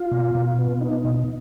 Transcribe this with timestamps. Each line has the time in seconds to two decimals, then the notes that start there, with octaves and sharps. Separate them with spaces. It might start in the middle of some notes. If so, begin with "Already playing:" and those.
Already playing: F4
0.12 B2
0.35 B2
0.58 B3
0.81 D#4
1.04 B2